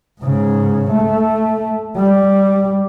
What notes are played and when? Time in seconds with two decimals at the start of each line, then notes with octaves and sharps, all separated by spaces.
0.21 G#2 C#3
0.91 A3
1.96 G3